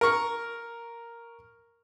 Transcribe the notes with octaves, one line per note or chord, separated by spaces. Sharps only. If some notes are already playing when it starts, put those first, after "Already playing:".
A#4 C#6